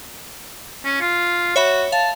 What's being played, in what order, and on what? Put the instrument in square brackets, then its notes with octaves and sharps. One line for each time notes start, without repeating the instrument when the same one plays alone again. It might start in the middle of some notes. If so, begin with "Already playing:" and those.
[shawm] C#4
F4
[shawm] F#4 [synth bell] C#5 E5 B5
[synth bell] F5 [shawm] A5